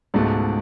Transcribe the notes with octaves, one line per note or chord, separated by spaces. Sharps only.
C#2 G#2 B2 A3